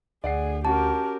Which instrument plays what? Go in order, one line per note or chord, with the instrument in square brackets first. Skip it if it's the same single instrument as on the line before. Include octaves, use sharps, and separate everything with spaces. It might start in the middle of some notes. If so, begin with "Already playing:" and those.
[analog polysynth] D2 [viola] G#4 [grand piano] D5 F#5 C7
[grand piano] C#4 F#4 [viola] G4 A#4 [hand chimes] A5